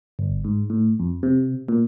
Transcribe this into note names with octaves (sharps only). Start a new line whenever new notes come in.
G1
G#2
A2
F2
C3
A#2